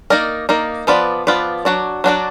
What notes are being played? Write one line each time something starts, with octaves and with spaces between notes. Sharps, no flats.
A#3 D#4 A#4 D5
A#3 D#4 A#4 D5
F3 B3 F4 B4 D5
F3 B3 F4 B4 D5
F#3 D4 F#4 D5
F#3 D4 F#4 D5